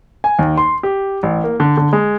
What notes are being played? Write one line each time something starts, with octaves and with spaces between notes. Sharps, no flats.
G#5
D#2
C6
G4
A1
A#3
D3
D3
G#3